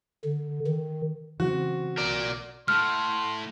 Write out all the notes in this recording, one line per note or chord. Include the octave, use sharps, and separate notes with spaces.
D3
D#3
C#3 E3 F#3 C4 F#4
B1 A#4 D5
A2 F#5 C6 F6